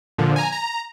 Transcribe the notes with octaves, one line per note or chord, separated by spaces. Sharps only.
A#2 D3 F3
G#5 A#5
A#5